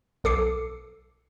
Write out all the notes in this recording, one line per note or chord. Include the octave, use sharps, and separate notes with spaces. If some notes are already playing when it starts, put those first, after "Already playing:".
B1 A4 D6 C7 C#7